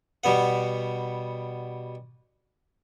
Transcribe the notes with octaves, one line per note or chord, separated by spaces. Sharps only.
B2 G3 B3 F#5